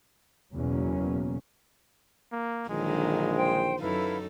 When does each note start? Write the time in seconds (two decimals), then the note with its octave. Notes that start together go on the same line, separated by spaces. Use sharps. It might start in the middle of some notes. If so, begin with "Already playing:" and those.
0.54 F#1 E2 B2 F#3 A#3 C#4
2.32 A#3
2.69 A#1 D3 D#3 F#3 G#3
3.36 C5 G5
3.80 F#2 D#4 E4 A4 B4 F5